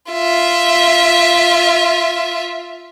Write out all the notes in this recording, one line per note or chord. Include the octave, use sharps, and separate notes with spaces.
F4 E5